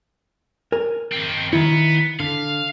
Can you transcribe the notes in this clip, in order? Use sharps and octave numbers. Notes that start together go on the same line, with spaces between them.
A#4 G#5
D#3 C4
D#3 B3 E4
D3 F5